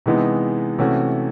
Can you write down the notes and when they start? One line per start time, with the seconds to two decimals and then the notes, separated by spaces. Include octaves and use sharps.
0.06 C3 E3 G#3 B3 D#4
0.79 C3 E3 A3 C#4 F#4